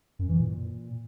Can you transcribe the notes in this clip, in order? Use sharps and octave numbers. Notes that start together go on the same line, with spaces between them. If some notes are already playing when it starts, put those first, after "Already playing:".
F#2
E3
A#2